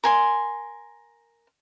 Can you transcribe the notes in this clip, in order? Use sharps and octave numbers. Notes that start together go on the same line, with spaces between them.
A#4 G#5 C6